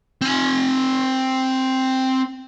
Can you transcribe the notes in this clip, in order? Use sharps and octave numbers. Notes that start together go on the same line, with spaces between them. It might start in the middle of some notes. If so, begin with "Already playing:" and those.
C4 G#5